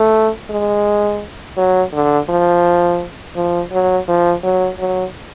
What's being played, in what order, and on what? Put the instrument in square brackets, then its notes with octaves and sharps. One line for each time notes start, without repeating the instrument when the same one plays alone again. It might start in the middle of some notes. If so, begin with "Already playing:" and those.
Already playing: [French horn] A3
G#3
F#3
D3
F3
F3
F#3
F3
F#3
F#3